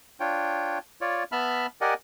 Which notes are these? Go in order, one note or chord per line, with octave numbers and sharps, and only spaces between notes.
D4 F4 C#5 G5
F4 C#5 D5
B3 E5 A5 B5 F6
G4 A#4 D5 D#5 F#5 G#5